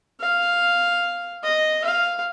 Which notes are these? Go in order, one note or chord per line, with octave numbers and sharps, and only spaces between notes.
F5
D#5
F5